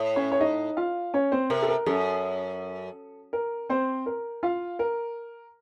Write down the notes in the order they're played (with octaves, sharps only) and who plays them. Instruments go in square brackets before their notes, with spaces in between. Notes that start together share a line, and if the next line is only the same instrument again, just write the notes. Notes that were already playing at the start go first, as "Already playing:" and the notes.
Already playing: [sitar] A2
[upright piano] C#4 C#5
C#5
D#4 D#5
F4 F5
C#4 C#5
C4 C5
[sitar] C3 [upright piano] A#4
[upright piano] A4
A#4
[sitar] F#2 [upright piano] A4
[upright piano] A#4
C4 C5
A#4
F4 F5
A#4